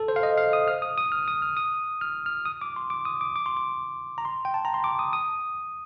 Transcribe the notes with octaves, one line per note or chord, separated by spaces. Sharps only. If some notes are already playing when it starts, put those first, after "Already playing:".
Already playing: A4
C5
F5
D#5
F5
D#6
F6
D#6
D#6
F6
D#6
F6
D#6
F6
F6
D#6
D6
C6
D6
D#6
D6
D6
C6
D6
A#5
C6
G5
A5
A#5
C6
D6
D#6
D#6